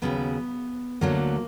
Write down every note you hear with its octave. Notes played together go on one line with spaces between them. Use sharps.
D#2 C#3 F#3 B3
D2 D3 F#3 A3 A#3